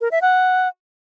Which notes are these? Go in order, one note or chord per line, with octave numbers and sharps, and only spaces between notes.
A#4
E5
F#5